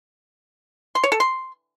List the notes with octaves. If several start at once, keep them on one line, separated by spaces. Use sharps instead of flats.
C6
C#5
A4
C6